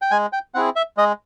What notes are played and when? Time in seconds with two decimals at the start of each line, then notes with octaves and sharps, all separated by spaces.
0.02 G5
0.11 G#3 G#5
0.33 G5
0.54 C4 E4 G#4 F#5
0.76 E5
0.97 G#3 D#5